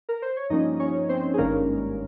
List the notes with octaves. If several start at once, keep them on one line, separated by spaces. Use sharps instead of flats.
A#4
C5
C#5
G2 F3 A#3 C#4 D#4 D#5
C#4 C#5
C4 C5
G#4
G#1 G2 D#3 G#3 A#3 C#4 A#4